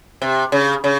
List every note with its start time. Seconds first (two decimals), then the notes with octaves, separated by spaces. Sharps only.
0.22 C3
0.52 C#3
0.84 C#3